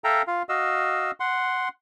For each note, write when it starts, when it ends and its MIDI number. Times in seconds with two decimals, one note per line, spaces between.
0.04 0.22 69
0.04 0.22 76
0.04 0.22 77
0.04 0.22 79
0.04 0.22 82
0.27 0.43 65
0.27 0.43 77
0.49 1.11 66
0.49 1.11 75
0.49 1.11 77
0.49 1.11 88
1.20 1.69 78
1.20 1.69 84